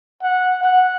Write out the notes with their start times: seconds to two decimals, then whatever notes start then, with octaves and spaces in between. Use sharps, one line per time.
0.22 F#5
0.64 F#5